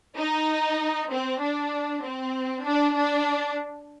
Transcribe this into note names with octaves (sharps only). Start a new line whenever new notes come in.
D#4
C4
D4
C4
D4
D4